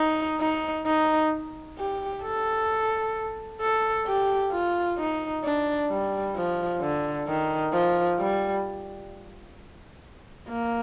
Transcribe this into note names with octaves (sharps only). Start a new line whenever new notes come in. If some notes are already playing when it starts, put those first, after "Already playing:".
Already playing: D#4
D#4
D#4
G4
A4
A4
G4
F4
D#4
D4
G3
F3
D3
D#3
F3
G3
A#3